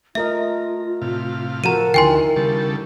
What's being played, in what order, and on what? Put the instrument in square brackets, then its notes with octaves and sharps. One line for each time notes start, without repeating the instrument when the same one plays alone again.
[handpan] A3 A#4 D#5 [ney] F4 [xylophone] E5
[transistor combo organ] A2 C3 F5
[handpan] F3 F#4 A4 [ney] A#4 [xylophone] A#5 D#7
[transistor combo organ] D2 [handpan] D#3 E4 [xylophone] G5 G#5 C6
[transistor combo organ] C#3 G3 A4